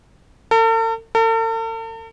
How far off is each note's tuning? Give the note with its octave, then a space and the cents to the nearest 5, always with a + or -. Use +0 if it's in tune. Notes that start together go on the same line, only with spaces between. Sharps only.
A4 +45
A4 +45